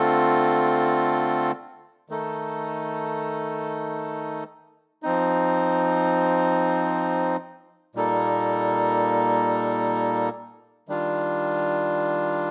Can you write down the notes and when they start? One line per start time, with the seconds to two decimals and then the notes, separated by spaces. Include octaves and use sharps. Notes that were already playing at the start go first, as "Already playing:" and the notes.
Already playing: D3 A3 C4 F4 A4
2.09 D#3 A3 D#4 A4
5.03 F3 C4 D#4
7.95 A#2 G3 A#3 D#4 A4
10.88 D#3 G3 D4 F4